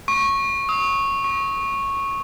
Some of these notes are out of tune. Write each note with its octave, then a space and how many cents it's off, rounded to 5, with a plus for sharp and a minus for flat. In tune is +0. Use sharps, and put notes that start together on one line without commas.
C#6 -10
D#6 +40
C#6 -10